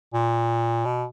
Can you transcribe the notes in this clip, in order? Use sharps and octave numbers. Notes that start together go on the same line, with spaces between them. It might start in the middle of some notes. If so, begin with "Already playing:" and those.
A#2
B2